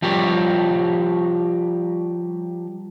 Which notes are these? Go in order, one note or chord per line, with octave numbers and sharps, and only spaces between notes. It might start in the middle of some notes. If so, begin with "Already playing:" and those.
F3 G3 G4 A#4 C#5